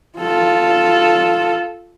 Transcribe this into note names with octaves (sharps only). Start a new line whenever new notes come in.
F4 A4